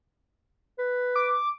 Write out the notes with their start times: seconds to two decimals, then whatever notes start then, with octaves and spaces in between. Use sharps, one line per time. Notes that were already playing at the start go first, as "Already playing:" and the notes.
0.79 B4
1.16 D6